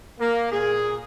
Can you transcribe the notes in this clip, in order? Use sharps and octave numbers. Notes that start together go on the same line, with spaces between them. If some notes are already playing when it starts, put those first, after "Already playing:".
A#3
A#2 G#4